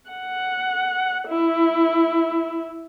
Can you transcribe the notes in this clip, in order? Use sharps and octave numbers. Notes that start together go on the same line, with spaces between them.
F#5
E4